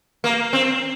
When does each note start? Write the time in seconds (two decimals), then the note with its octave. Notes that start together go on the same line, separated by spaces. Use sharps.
0.24 A#3
0.53 C4